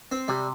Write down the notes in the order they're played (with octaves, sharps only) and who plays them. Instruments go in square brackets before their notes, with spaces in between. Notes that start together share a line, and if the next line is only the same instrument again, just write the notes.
[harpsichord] C4
[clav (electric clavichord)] C3 [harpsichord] G3